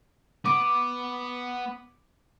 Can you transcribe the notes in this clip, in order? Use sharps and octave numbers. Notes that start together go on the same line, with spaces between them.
B3 D6